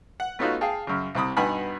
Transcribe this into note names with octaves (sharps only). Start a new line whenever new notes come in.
F#5
A3 B3 C#4 D#4 F4 F#4
G#4 F5 G5 A5
F#2 C#3
C2 C3 B5 D#6
G2 B2 D#4 F#5 G#5 B5